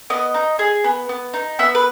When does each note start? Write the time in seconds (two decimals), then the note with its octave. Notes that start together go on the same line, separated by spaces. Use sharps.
0.10 B3 D#5
0.34 D#4
0.59 G#4
0.84 B3
1.09 B3
1.34 D#4
1.59 B3 E5
1.75 B4